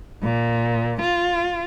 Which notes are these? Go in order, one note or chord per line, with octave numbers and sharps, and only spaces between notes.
A#2
F4